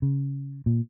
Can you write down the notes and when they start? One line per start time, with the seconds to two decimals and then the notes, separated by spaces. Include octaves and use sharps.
0.02 C#3
0.66 A#2